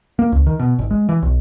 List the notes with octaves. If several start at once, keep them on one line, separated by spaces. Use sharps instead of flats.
A#3
C#2
D#3
B2
G#1
G#3
E3
B1